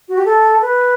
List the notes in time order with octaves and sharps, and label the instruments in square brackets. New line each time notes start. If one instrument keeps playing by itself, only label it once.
[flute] F#4
G4
A4
B4